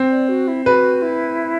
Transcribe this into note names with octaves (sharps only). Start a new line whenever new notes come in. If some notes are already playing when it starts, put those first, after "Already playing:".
Already playing: C4
D5
F#4
E4
F#4 B4
E4